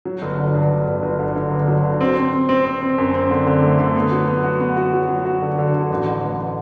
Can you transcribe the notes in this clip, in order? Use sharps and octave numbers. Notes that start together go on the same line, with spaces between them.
F#3
G1
D3
G2
G1
G1
G1
D3
D3
G1
F#3
D3
C4
C4
C4
C4
C4
C4
F#2
C4
D3
D3
A3
D3
B3
F#3
B3
F#4
B3
F#4
F#3
F#3
F#4
D3
D3
D3
A1
A1
A1